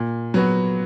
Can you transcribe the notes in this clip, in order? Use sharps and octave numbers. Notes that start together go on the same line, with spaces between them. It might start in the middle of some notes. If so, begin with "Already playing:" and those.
Already playing: A#2
F#3 B3 F#4